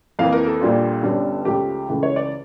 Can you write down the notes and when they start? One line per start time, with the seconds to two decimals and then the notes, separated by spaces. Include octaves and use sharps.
0.19 F2 E3 A#3 F5
0.32 A#4
0.47 A4
0.61 A#1 A#2 G3 D4 F4
1.03 G1 G2 D3 G3 C#4
1.45 C#2 C#3 F3 A3 G4
1.88 C#2 C#3 E3 A3
2.03 C#5
2.16 D5